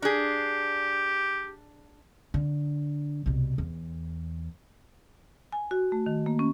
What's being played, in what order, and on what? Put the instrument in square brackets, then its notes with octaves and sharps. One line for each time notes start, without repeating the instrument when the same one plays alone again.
[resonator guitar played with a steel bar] D4 G#4 [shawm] G4
[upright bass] D3
C2 B2
E2
[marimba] G#5
F#4
A3
D#3
A#3
C#4